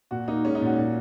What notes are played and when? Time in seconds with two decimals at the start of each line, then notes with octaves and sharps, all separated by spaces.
0.11 A#2 F#4
0.28 A#3 D#4
0.45 G#3 C#4
0.55 D#4
0.61 A#2 F#4
0.78 A#2